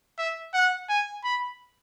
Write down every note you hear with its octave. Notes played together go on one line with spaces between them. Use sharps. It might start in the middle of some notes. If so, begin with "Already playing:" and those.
E5
F#5
G#5
B5